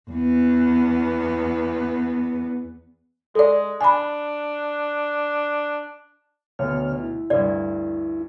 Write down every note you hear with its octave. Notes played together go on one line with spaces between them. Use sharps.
E2 B3
G#3 A4 D5
D4 G#5 B5
D2 B2 D3 C#5 F6
E4
D2 G2 D5